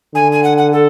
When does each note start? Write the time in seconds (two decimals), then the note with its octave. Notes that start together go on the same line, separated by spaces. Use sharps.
0.15 D3 G#5
0.32 G#5
0.44 F#5
0.58 F#5
0.73 A4